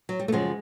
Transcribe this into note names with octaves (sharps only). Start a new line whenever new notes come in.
F#3
G3
A3
F#2 C#3 F3 G#3